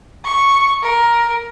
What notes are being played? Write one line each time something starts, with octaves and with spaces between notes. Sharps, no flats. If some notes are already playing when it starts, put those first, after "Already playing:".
C#6
A#4